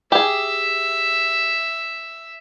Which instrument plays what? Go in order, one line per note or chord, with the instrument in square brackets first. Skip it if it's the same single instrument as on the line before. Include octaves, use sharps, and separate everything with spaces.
[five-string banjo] G4 G#4 [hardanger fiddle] E5